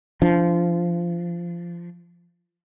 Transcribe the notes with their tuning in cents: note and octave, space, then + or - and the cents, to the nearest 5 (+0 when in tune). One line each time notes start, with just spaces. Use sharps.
F3 -20 D4 +0